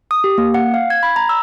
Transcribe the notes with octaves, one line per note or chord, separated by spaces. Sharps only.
D#6
G4
A#3
F#5
F5
G#6
B5
A#5
E6